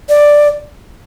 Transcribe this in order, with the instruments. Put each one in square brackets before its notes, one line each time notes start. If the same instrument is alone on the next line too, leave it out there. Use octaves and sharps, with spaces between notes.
[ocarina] D5